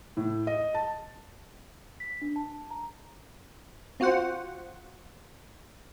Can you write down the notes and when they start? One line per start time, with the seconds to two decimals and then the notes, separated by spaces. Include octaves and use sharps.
0.17 A2
0.47 D#5
0.74 A5
2.00 B6
2.22 D4
2.36 A5
2.71 A#5
4.00 C4 F4 F#4 C5 F#5